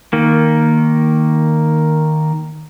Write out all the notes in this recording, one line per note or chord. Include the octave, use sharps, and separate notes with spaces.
D#3 A#3